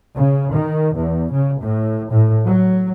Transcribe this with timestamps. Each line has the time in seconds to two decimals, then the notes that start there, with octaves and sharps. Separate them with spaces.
0.15 C#3
0.53 D#3
0.97 E2
1.32 C#3
1.62 A2
2.12 A2
2.45 F#3